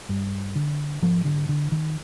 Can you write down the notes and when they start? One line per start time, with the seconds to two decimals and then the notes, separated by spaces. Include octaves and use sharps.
0.09 G2
0.56 D3
1.02 G#2 F3
1.25 D3
1.49 D3
1.72 D#3